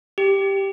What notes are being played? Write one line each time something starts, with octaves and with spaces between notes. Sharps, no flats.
G4